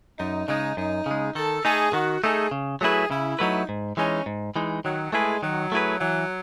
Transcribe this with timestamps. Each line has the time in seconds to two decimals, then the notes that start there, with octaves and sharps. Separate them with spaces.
0.19 F#2 D#4
0.48 C#3 G#3 D#4
0.77 F#2 D#4
1.06 C#3 G#3
1.35 D#3 A4
1.65 A3 D#4 G#4 A4
1.93 D#3 F#4
2.23 A3 D#4 G#4 A4
2.51 C#3
2.81 F#3 A3 E4 G#4 B4
3.11 C#3 E4
3.39 F#3 A3 D#4 E4 B4
3.69 G#2
3.97 E3 G#3 C#4 D#4
4.26 G#2
4.56 E3 G#3 D#4
4.84 D#3 F#3
5.13 G#3 A3 E4 G#4 B4
5.43 D#3 F#3
5.72 A3 E4 G#4 B4
6.01 E3 F#3